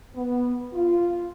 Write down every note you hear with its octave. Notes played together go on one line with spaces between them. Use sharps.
B3
F4